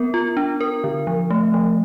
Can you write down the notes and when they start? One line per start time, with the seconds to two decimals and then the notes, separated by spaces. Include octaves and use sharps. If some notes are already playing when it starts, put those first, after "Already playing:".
Already playing: B3 A#4
0.14 F4
0.37 D4
0.61 A#4
0.84 D3
1.07 F3
1.31 A3
1.54 F3